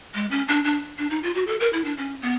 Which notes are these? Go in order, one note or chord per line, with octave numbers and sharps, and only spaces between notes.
G#3
C#4
D4
D4
D4
D#4
F4
F#4
A4
A#4
E4
D4
C#4
B3